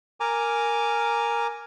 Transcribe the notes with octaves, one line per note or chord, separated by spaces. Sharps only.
A#4 G#5 A#5 D6